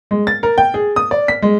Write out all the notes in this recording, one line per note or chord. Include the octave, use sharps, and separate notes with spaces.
G#3
A6
A#4
G5
G#4
D#6
D5
B6
G#3